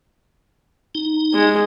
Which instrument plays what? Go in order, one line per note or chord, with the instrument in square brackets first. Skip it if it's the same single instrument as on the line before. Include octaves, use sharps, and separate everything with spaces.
[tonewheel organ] D#4
[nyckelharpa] G#3